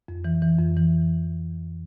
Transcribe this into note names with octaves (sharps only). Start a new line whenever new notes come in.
F2
E3
E3
F2
E3